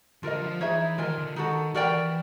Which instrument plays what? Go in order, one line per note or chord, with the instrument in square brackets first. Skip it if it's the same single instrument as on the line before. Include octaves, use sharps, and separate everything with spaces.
[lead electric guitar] D3 [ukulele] F4 A#4 D#5
[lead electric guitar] F3
[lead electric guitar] E3 [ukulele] D#4 G#4 C#5 E5
[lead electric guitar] D#3 [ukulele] F4 A#4 D#5 G#5
[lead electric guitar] D3
[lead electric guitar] D#3 [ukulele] D#4 F#4 A4
[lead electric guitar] E3 [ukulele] F#4 A#4 D5 G5